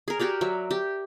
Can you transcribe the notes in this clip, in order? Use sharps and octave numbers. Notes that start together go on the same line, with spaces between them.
G#4 A#4
F#4 G4 A#4 D5
F#3 E5
G4